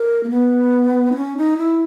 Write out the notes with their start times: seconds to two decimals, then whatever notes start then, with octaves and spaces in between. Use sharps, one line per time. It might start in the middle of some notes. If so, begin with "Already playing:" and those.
Already playing: A#4
0.23 A#3
0.30 B3
1.12 D#4
1.16 C#4
1.37 D#4
1.58 E4